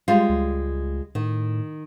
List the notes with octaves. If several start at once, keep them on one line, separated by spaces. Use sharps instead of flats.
G3 G#3 F4
C#2
A2 D#3